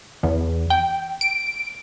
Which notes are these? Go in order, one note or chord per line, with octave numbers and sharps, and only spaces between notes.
E2
G5
D7